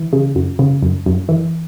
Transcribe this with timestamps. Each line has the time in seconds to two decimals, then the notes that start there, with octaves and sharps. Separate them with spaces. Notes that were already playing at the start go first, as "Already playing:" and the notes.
Already playing: E3
0.13 C#3
0.35 F#2
0.59 C#3
0.83 F#2
1.06 F#2
1.29 E3